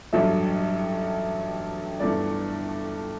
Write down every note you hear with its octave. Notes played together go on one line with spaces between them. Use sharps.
A1 G2 F#3 A3 E5
G1 G2 E3 A3 D5